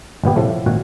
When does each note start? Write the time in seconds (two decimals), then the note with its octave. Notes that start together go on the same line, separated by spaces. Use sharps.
0.24 G1 A#2 B3 G4
0.36 A2 C3 F3 A3
0.66 G#1 A#2 F#4 F#5